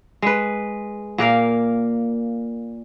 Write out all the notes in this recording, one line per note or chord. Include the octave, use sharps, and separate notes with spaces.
G#3 B4
A#2 A#3 A#4 F5